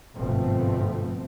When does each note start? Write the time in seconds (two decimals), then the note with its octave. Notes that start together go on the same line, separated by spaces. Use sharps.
0.15 G1 G#2 B2 F3 A3 C4